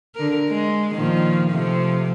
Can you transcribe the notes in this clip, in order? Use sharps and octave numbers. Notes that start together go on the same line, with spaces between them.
D3 A#4
G#3
A#2 D#3 F3
C3 F3 A3